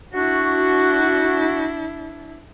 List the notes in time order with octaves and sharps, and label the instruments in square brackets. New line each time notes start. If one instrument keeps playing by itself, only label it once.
[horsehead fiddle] D4 E4 [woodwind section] F#4